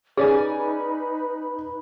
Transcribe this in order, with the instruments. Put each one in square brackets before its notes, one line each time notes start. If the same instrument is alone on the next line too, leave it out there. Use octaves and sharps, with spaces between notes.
[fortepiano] C#4 D5 G#5 [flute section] D#4 B4 B5 [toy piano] G#4